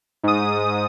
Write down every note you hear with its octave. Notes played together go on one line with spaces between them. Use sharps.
G#2 D#6